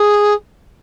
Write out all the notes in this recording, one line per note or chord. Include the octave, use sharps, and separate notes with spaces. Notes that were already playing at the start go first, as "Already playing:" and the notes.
Already playing: G#4